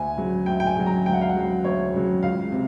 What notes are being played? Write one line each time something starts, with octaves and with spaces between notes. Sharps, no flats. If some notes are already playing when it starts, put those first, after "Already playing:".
Already playing: D2 G#5
C#3 F#3
D2 G5
G5
G#5
C#3 F#3
A#5
D2 G5
F#5
F5
F#5
C#3 F#3
D2 C#5
C#3 F#3
C#2 F5
C3